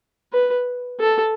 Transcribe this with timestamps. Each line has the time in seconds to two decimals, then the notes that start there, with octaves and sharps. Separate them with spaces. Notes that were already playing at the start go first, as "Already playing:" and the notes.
0.33 B4
1.00 A4